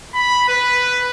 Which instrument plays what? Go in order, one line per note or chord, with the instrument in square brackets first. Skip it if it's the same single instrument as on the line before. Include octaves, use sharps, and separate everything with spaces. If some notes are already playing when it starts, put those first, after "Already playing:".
[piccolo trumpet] B5
B4